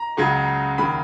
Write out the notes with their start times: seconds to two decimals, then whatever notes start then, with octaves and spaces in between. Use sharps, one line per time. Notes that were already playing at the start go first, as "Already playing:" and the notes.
Already playing: A#5
0.17 C#2 C#3 F#3
0.78 D#2 C#3 F#3 B5